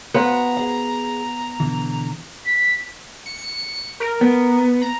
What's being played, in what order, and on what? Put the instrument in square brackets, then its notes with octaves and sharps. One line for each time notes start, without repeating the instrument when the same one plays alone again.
[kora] B3 [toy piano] F#4 C5 F5 [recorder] A#5
[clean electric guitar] G#4 F#5
B2 D3 E3
[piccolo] B6
[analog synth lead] C#7
A#4
[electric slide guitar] B3
[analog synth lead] A#5